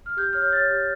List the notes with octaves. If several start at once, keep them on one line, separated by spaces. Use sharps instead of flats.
F6
G4 G6
C#5 F6
G6
C#5 A6
G4